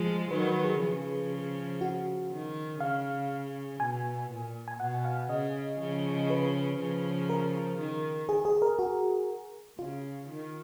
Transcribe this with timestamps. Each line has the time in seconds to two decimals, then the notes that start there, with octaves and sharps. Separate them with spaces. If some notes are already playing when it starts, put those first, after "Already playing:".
Already playing: F3 G#3 G#4
0.31 D#3 F#3 B4
0.47 B4
0.64 G#4
0.81 C#3 F3
1.81 F#4
2.31 D#3
2.80 C#3 F5
3.80 B2 G#5
4.30 A#2
4.68 G#5
4.80 B2 F#5
5.05 F5
5.29 C#3 D#5
5.79 C#3 F3
6.30 B4
6.79 C#3 F3
7.29 A#4
7.79 D#3
8.29 G#4
8.45 G#4
8.62 A#4
8.79 F#4
9.78 C#3 F4
10.29 D#3